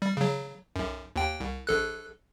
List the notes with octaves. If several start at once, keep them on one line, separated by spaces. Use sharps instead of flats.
G3
C#3 F#3
B1 F#2
D#2 G5
C2
A#1 A4 F#6